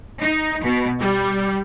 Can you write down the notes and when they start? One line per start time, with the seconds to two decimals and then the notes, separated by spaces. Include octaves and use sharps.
0.22 D#4
0.64 B2
1.00 G3